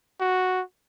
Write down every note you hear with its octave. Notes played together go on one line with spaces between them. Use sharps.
F#4